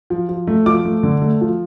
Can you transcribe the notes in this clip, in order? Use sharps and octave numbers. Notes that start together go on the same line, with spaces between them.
F3
F3
A3
F3 D6
A3
D3
A3
F3